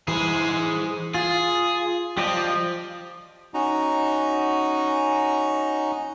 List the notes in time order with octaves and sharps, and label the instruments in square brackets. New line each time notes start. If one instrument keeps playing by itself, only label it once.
[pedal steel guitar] E3 [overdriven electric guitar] G#4 C5
[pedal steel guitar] F4 [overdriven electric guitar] G#4
[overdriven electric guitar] F3 [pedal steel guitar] G4 D5 D#5
[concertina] C#4 D#4 F#4 A#5